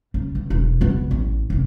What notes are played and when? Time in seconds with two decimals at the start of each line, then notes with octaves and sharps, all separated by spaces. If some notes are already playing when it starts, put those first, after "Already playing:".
0.14 C#3
0.35 C#2
0.50 E1
0.81 C#2 B3
1.11 A1
1.50 F1 F2